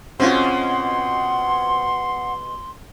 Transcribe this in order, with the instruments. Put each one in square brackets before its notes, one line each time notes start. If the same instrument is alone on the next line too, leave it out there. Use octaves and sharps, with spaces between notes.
[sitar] B2 G#3 [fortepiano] C4 C#4 F4 [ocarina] F#5 [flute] C6